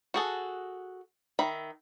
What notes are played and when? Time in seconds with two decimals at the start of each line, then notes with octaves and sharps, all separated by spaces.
0.14 F#4 G#4 A4
1.39 D#3 E5 B5